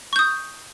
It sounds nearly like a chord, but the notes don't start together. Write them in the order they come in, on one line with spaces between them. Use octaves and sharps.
C#6 G6 D#6